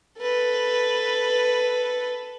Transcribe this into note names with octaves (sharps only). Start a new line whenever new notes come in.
A4 B4